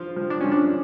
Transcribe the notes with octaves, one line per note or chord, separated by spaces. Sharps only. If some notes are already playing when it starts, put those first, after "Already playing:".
Already playing: F3 F4
F3
D4
F3 C#4
D4